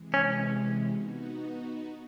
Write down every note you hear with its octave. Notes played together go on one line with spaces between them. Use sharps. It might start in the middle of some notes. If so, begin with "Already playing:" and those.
Already playing: C3 E3 G#3
C#4
B3 D#4 F#4